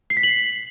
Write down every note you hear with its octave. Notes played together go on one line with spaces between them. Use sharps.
C7
B6
F#7